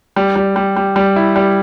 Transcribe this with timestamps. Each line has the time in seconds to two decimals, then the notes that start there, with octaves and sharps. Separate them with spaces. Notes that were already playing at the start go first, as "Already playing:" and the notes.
0.16 G3
0.36 G3
0.56 G3
0.76 G3
0.96 G3
1.16 E4
1.36 G3